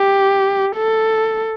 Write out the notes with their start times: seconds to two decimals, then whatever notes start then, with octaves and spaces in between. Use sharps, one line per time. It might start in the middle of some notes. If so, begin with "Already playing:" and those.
Already playing: G4
0.76 A4